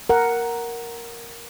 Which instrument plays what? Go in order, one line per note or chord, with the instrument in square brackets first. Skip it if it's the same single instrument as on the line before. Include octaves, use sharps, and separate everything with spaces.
[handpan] A#4 F#5